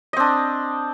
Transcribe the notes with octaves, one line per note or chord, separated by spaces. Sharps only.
C4 D4 D#5